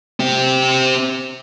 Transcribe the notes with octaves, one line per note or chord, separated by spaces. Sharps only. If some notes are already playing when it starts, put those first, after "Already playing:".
C4 G4